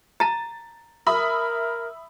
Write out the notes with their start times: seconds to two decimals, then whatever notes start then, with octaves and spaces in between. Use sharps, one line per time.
0.20 A5 A#5 A6
1.07 A#4 E5 B5 D#6